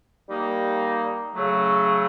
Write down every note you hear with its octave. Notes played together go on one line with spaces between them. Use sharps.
G3 A#3 D#4
C#3 F#3 A3